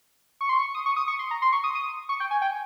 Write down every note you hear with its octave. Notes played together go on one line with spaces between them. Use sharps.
C#6
C6
C#6
D#6
C#6
D#6
C#6
C6
A#5
C6
C#6
D#6
D#6
C#6
G5
G#5
G5